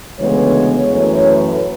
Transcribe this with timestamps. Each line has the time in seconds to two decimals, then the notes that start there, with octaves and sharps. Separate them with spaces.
0.18 D2 C#3 E3 G#3 B3 C#5
0.91 F#2 E3 A3 C#4 C#5
1.27 B4